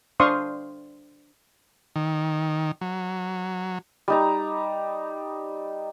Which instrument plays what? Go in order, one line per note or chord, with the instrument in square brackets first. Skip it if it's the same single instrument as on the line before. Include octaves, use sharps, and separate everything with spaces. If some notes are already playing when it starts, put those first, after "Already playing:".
[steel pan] D4 C5 F5 C6 C#6 D#6
[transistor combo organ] D#3
F#3
[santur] G3 D#4 A#5